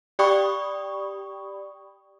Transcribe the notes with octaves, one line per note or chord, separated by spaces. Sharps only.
G4 D5 G5 B5 C#6 D#6